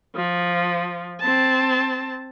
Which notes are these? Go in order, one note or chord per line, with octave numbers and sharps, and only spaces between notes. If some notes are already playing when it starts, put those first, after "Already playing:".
F3
C4 A5